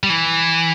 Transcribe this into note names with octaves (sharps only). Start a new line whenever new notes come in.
G3
E3